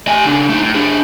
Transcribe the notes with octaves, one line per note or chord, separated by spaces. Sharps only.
A3 G#5
C#3 D4
A3 D#4
A2
D4 G#4